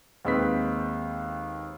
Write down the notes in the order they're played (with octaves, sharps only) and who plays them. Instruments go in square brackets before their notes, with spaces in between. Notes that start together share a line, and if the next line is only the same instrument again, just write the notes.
[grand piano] D#2 G#3 C4 B4 B6